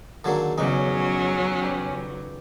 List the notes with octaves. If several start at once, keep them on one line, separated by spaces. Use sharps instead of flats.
D3 D#3 F#3 A#3 G#4 E6
F1 E2 C#3 F#3 C#4 D#4 D6
G4 B4 D5